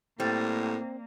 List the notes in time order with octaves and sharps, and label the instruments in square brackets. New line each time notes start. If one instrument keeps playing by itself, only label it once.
[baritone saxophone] A2 [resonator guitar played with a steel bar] G3 [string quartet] A#3 [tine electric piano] C4